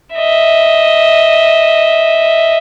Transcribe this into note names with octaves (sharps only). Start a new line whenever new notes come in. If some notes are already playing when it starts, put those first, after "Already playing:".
D#5 E5